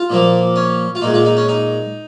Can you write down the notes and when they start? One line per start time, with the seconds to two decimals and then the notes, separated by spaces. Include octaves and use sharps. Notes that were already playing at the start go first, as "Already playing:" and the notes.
Already playing: F4
0.10 A#2 F3 A#3
0.56 C#4
0.95 F4
1.02 A#2 G#3 D#4
1.14 F4
1.25 D#4
1.37 C#4
1.48 D#4